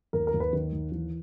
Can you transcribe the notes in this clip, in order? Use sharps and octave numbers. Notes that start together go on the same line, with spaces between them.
D#2 A#4
A#4
D#2
B4
D#3
D#2
E3